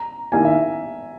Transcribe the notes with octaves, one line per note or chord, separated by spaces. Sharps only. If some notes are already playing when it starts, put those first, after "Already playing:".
Already playing: A#5
D#3 A#3 E4 G4 G#5
E5